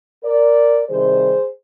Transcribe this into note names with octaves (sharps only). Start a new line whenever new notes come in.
A#4 D5
C3 D#3 G3 G#4 C5